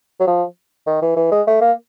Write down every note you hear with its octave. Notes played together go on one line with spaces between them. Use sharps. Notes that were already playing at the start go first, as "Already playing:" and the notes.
F#3
F3
D#3
E3
E3
G#3
A3
A#3